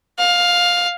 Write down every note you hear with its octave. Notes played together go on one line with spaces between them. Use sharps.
F5